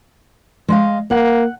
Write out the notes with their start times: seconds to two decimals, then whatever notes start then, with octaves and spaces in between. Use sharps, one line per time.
0.68 G#3 D#5 F5
1.11 A#3 F#5